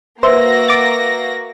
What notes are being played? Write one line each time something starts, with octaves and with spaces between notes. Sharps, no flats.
A#3 F#4 B4 C5 E5 E6 A#6
D6 A6